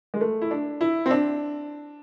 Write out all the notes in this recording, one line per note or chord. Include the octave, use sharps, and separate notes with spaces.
G#3
A3
E4
D4
E4
C4
D4